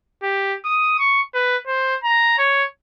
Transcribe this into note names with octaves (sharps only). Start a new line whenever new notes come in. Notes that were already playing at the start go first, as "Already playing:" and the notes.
G4
D#6
C#6
B4
C5
A#5
C#5